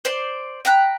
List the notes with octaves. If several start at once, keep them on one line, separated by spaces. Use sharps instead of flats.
C5 D5 C6
G5 A#5 B5 F#6